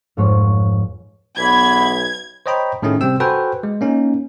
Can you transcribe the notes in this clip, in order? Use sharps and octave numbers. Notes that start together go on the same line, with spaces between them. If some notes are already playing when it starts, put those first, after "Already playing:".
F1 G#2 C#5
B1 E2 E3 B3 B5 G#6
C5 C#5 D#5 G5 A#5 B5
A2 D#3 A3 C#4 G#4
C3 G3 C4 G5 E6
F#4 A4 B4 C5 G5 G#5
G#3
A#3 C#4 D#4